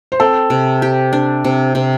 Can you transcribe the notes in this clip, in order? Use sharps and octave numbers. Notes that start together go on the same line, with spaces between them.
C5
C4 A4
C3
G4
D4
C3
C3